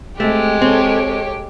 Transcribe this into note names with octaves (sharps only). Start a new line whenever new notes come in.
G#3 A3 C4 G4
C4 A4 C#5